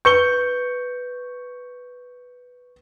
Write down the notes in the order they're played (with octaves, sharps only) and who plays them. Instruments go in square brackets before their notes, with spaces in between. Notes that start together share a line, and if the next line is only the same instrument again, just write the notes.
[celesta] B4 G6 [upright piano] C#6 C#7 G7